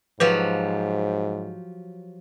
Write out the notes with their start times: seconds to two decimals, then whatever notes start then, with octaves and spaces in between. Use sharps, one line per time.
0.20 G#2 F3 F#3 G4 B4